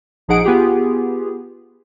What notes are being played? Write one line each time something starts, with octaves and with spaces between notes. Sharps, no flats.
A#1 F3 D#4 G#4 F#5 D7
B3 F4 G4 G#4